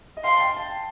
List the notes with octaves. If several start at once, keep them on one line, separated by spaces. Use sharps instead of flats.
D#5
F5 C6
A5
G5
A5